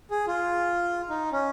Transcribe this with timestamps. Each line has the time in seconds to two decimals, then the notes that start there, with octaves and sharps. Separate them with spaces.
0.11 G#4
0.27 F4
1.10 D#4
1.32 C#4